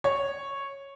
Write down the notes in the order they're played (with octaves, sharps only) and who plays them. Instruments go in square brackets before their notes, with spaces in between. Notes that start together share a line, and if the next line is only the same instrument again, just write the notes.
[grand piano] C#5